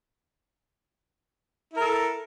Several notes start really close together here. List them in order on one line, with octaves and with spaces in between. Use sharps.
E4 A#4 A4